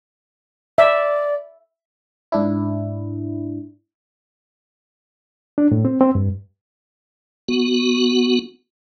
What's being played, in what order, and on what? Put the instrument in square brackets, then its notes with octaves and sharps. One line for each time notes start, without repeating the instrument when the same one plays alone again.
[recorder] D5 [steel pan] E5
[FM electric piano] G#2 D4 E4
[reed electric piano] D4
A2
C4
C4
G2
[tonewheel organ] B3 F#4